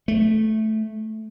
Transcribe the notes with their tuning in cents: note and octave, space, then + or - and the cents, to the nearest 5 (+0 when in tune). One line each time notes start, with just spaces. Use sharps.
A3 -10